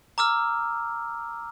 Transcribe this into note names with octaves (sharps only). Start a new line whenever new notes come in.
A#5 D6 E6 F6